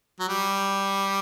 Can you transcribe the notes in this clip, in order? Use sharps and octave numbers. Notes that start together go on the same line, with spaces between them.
F#3
G3